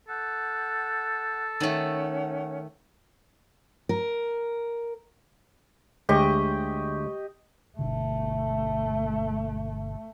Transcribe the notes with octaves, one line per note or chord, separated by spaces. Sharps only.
A4 F#5 F#6 G6
D#3 A3 C#4 F#5
A#4
D2 G#3 G4 D#5 C#6
G1 B2 D3 A3